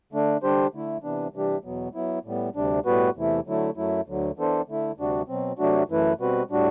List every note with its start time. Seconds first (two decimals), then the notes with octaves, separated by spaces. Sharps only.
0.13 D3 A3 D4
0.43 D3 G3 D4 G4 C5
0.73 D3 A3 E4
1.03 C3 E3 B3 D4
1.34 C3 E3 G3 D4 G4
1.64 E2 B2 F#3 B3
1.95 F#3 B3 E4
2.25 A2 G3 B3
2.55 D2 C3 G3 D4
2.86 A2 G3 B3 F#4 B4
3.16 E2 C3 E3 A3 E4
3.46 D3 F#3 A3 E4
3.76 F#2 F#3 A3 E4
4.07 D2 D3 F#3
4.37 E3 B3 D4 A4 C5
4.68 D3 A3 E4
4.98 D2 C3 G3 D4 F#4
5.28 B2 F#3 C4
5.59 C3 F#3 A3 D4 F#4
5.89 F#2 E3 A3 E4 B4
6.19 B2 G3 C4 F#4 B4
6.50 A2 G3 D4 F#4